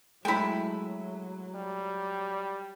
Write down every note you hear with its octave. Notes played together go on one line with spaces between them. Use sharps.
F#3 G#3 A3 E4 G5 B5
G3